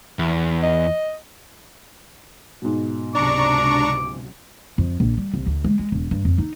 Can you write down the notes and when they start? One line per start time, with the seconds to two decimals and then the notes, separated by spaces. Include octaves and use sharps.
0.19 E2
0.63 D#5
2.62 G#2 B2
3.15 C#2 C3 F#3 D4 A#5 C#6 D6
4.78 F2
5.00 A#1
5.18 G3
5.34 C2
5.46 D2
5.64 G#3
5.79 G#3
5.92 E1
6.11 G2
6.25 F2
6.38 D#4